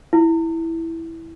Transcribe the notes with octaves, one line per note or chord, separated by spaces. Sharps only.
E4